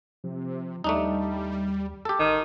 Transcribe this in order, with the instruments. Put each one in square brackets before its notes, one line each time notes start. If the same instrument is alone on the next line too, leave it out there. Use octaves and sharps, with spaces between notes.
[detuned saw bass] C3 [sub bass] F3
[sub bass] D#2 [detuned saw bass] G3 [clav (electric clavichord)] A3 D4 D#4
[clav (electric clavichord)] G4 A4
[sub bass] A1 [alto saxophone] D#3